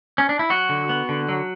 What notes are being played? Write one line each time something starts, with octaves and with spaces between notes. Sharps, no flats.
C#4
D4
E4
F#3 F#4
D3
B3
D3
F#3